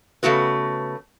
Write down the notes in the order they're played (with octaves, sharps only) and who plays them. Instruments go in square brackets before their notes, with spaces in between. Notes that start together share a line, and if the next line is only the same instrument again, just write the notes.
[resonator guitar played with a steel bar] C#3 A3 B3 F#4 B4